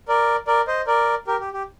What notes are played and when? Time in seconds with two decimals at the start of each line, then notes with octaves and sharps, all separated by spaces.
0.08 A#4 D5
0.47 A#4 D5
0.67 C5 D#5
0.87 A#4 D5
1.27 G4 A#4
1.40 G4
1.53 G4